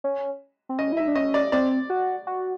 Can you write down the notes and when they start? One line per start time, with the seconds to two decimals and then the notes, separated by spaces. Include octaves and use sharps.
0.04 C#4
0.69 C4
0.78 C#4 D#5
0.92 E4
0.97 E5
1.00 D#4
1.07 D4
1.16 C#4 D#5
1.34 D5
1.52 C4 D5
1.90 F#4
2.27 F#4